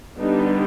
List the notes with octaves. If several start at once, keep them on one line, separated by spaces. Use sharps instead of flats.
D3 G3 B3 D4 D#4